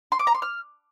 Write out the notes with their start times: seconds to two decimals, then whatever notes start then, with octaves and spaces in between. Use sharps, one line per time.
0.12 C6
0.19 D6
0.27 A#5
0.35 C6
0.42 F6